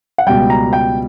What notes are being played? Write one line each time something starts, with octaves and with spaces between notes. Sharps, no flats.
F#5
C#2 B2 G3 G5
A#5
G5